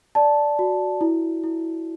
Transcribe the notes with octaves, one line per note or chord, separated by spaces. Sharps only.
D5 A5
F#4
E4
E4